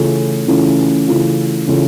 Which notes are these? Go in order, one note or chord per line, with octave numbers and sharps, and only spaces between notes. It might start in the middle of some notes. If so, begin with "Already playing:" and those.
Already playing: C#3 E3 A3 C#4 F4
C#3 E3 A3 C#4 F4
C#3 E3 A3 C#4 F4
C#3 E3 A3 C#4 F4